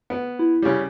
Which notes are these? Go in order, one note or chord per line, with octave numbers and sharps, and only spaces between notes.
B3
E4
C#3 G3